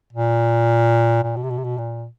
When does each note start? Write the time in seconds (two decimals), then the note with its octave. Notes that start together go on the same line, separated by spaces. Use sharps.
0.13 A#2
1.23 A#2
1.36 B2
1.43 C3
1.50 B2
1.58 C3
1.64 B2
1.78 A#2